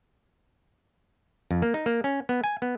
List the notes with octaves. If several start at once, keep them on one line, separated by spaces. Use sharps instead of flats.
F2
A#3
D#4
A#3
C#4
B3
G#5
B3